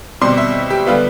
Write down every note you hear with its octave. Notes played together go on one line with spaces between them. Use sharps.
B2 G3 C4 C6
E5
G4
D3 G3 B3 F4